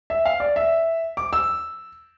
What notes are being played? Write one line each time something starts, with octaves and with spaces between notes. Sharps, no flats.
E5
F5
D5
E5
D6
E6